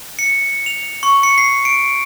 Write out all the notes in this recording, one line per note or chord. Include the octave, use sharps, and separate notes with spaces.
C#7
F7
C#6
C#7
C7
D7